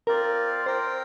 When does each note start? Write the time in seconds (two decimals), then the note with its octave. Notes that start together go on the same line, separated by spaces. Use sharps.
0.07 C4 F4 A#4 D5
0.66 C4 A#4 C5 G5